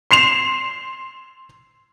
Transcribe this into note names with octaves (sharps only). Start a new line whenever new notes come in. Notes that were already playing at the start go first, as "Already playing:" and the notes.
C6 C7 E7 F7